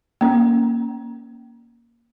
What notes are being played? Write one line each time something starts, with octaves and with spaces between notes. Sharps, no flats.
A#3 C#4